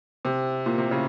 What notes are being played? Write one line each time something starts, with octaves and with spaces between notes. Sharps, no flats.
C3
A#2
C3
C#3